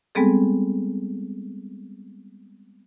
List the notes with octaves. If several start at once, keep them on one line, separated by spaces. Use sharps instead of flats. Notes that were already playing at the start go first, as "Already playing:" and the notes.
G3 G#3 B3 C4 G#4 A4